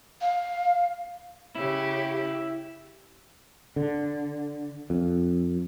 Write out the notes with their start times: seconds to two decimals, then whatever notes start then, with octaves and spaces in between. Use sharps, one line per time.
0.21 F5
1.55 C#3 E4 G4
3.76 D3
4.90 F2